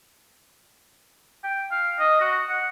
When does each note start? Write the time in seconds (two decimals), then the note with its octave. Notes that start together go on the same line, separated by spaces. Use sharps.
1.44 G5
1.71 F5
1.99 D#5
2.21 F#4
2.49 F#5